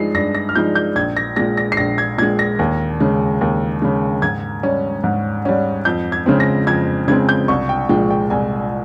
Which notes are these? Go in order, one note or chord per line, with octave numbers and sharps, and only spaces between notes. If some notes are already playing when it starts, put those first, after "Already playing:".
Already playing: G2 F3 G#3 D#4 C7
G2 A#6
A#6
F6
F3 G#3 D#4 G6
G6
A#1 G#6
A#6
A#2 G#3 A#6
A#6
C7
A#1 A#6
G#6
A#2 G#3 G#6
A#6
D#2
C#3 G#3
D#2
C#3 G#3
G#2 G#6
G3 C#4
G#2
G3 C#4
F2 G6
G#6
C#3 G#3 C4
A#6
F2 G#6
C#3 G#3 C4 G#6
G6
C2 C#6
G5
A#2 F3 G#3 G5
G5
C2 G#5